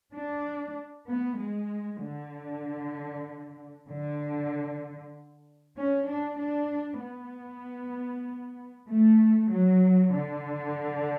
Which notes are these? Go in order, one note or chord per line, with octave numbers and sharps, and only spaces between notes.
D4
B3
G#3
D3
D3
C#4
D4
D4
B3
A3
F#3
D3